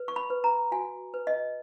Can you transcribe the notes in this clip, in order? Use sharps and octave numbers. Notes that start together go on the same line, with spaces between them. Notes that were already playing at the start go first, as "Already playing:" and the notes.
Already playing: B4
C#6
B5
B4
A#5
F#4 G#5
B4
D#5